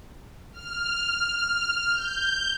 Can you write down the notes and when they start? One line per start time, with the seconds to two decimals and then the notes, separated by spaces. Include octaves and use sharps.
0.52 F6
1.91 G6